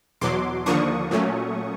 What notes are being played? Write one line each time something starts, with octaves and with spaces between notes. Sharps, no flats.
E2 B2 F#3 C6 D6
D#2 D3 F3 A#3 D4 C#6 D#6
A#2 F#3 A3 C#4